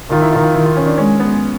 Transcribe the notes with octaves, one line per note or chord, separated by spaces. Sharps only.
D#3 F4
E4
F4
F4
D#3 E4
F4
C#4
D4
G#3 C#4
B3